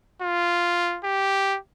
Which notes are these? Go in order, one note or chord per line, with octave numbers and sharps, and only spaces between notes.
F4
G4